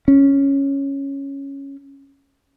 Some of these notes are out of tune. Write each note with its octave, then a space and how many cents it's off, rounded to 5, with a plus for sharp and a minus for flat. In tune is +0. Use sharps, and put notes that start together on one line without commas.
C#4 -5